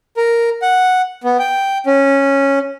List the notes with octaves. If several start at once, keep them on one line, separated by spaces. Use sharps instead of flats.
A#4
F#5
B3
G5
C#4